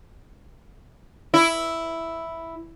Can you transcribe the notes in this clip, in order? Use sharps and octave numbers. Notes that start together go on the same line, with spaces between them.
E4